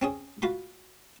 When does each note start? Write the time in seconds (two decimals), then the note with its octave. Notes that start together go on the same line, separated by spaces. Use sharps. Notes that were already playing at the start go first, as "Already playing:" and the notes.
0.02 C4 C#4 G#4
0.42 F4 F#4 B5 C6